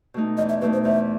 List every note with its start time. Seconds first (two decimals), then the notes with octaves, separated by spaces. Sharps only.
0.14 B2 A3 D#4
0.37 E2 D#5
0.49 E5
0.61 B2 A3 D#4 B4
0.73 C5
0.84 E2 E5